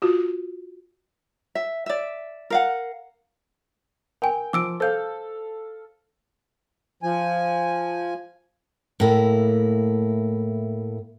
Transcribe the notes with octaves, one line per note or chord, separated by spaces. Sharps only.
F4 F#4
E5
D5 E5
A#4 F5 F#5
A#4 G5 G#5
F3 D6 E6 D7
A4 C5 F5 G6
F3 G#5
A2 A#3 E4